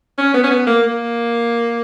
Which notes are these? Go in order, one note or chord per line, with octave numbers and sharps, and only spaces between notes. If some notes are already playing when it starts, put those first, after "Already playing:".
C#4
B3
C#4
B3
A#3
A#3